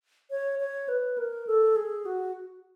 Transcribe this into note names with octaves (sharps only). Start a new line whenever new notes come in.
C#5
C#5
B4
A#4
A4
G#4
F#4